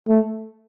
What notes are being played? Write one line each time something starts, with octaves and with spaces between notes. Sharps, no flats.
A3